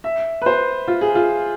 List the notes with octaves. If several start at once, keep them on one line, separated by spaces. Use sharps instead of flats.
E5
B4
C5
F4
G#4
F4